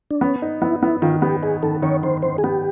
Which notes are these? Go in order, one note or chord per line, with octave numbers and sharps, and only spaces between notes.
D4
B3 C#4
D#4
B3 E4
B3 E4
D#3 F4
B3 G4
D#4 G#4
D#3 A4
D#3 C#5
D#3 C5
D#3 C5
G#4
B3 G4